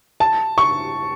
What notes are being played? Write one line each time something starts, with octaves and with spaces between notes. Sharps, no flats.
A5
C#6